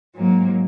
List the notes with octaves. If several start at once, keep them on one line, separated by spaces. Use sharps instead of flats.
G#2 F#3 A#3